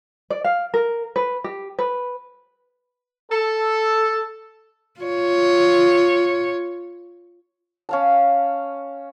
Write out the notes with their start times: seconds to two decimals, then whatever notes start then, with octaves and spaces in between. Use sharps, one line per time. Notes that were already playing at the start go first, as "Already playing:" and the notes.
0.30 D5
0.44 F5
0.74 A#4
1.16 B4
1.44 G4
1.79 B4
3.31 A4
5.00 F4 C#5
7.89 C#4 F5 A5